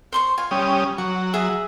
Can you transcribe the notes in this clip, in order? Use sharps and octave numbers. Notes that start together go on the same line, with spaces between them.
C5 C6 C#6
F4 G#5
G3 C#4 D#6
F#3 C#6
G#4 E5